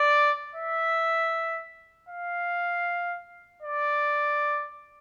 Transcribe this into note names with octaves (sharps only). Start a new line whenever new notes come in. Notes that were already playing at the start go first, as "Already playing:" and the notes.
Already playing: D5
E5
F5
D5